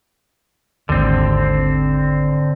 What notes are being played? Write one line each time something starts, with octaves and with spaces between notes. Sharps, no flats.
G#1 D#2 D3 C4